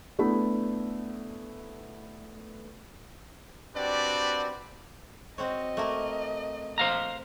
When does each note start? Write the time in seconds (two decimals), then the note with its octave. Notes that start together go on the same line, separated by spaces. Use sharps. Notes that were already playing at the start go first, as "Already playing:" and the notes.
0.19 A3 B3 D4 E4 B5
3.76 C4 D4 F#4 G4 B4 D5
5.38 C4 F#4 C#5 D#5
5.77 A3 A#3 A#4
6.78 C5 F5 A#5